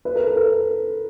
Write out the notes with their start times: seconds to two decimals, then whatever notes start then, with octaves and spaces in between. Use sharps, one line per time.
0.05 B4
0.16 A#4
0.26 A4
0.36 A#4